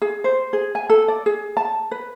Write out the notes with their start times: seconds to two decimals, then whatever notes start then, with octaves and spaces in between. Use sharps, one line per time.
0.02 G#4
0.24 C5
0.53 G#4
0.75 G#5
0.90 A4
1.08 D5
1.26 G#4
1.57 A5
1.91 B4